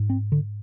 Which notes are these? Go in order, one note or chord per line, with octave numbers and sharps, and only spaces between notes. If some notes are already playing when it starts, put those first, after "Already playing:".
Already playing: G#2
C4
D3